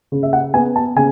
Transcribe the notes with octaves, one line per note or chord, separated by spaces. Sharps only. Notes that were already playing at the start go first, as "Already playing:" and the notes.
C#3
E5
F#5
B3 G#5
A5
C#3 G#5